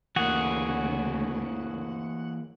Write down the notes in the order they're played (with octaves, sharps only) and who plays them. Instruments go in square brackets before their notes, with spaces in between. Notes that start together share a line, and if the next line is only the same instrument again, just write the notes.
[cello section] D2 C#3 [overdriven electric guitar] E3 A#3 [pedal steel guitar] F#4 G#4 F#5